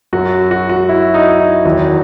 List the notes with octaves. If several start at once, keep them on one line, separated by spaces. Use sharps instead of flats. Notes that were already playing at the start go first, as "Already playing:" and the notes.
F#2 F#3 F#4
F#4
F#4
E4
D#4
E4
E2 D#3 F#3 F#4